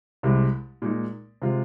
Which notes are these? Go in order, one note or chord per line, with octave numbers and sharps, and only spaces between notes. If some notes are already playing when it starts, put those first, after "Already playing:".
C2 C3 G#3
A#2 G#3 D#4
C3 G#3 F4